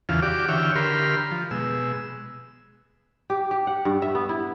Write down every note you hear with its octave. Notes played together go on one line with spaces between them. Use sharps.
E2 C#3 E3 F4 F5
F#4 G4 D5 D6
D3 E3 C#5 E5 G5 F6
D3 G4 A#4 B5 C6 F6
F3
B2 G#3 E6
G4
G4
F#5
G2
E5
B3
E4